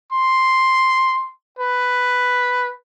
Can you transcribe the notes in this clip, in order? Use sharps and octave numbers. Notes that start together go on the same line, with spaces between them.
C6
B4